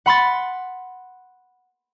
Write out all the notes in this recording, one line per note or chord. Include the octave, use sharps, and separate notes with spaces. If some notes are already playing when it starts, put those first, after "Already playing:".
F#5 B5 C6 A6